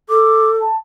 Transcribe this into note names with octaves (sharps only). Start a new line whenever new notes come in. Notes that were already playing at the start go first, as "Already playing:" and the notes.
A4 D6
A5